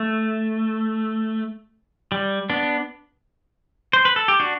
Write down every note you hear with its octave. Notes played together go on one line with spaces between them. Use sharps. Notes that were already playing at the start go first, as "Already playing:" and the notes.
Already playing: A3
G3
B3 D4
C5
B4
A4
G4
D4 F#4